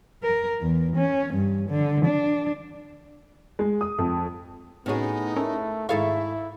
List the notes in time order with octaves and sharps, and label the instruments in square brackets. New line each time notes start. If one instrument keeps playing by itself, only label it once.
[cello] A#4
E2
C#4
G2
D3
D4
[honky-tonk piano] G#3
D#6
F2
[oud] A2 G#4 [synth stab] C3 C#4 F#4 [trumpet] B3 [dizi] D#4
[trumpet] A3 [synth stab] C#4 A4 A#4
[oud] G#2 A4 F5 [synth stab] D#3 G#4 C#6 [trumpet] E4 [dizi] E5